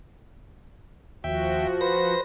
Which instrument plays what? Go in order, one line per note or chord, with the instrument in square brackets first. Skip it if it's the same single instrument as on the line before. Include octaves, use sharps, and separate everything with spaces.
[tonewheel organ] D#2 E5 G5 [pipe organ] F3 F#4
[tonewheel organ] B4 C5 A#6